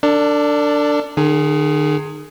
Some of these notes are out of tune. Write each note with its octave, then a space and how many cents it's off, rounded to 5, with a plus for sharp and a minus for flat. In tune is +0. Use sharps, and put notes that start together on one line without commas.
D4 +0 A4 +45 D5 +0
D#3 -45 G#4 +0